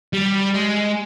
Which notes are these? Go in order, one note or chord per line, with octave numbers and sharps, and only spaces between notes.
G3
G#3